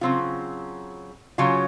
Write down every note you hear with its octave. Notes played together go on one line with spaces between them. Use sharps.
C#3 F#3 C4 F4
C#3 F#3 C#4 F4